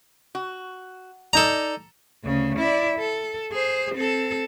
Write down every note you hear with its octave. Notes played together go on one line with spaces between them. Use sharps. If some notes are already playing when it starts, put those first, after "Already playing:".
F#4
D#4 A4 D5 A#5
D2 C#3
E4 D5
A4
G#4 C5
C4 A4